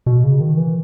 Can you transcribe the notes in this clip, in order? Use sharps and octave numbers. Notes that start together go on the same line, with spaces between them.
B2
C#3
D#3
E3